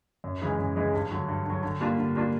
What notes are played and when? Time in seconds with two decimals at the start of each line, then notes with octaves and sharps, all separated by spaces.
0.24 F#2
0.42 C#3 E3 G#3
0.58 F#2
0.76 C#3 E3 G#3
0.93 G2
1.11 D3 F#3
1.28 G2
1.45 D3 F#3
1.63 D3
1.81 G3 A#3 D4 F4
1.97 D3
2.15 G3 A#3 D4 F4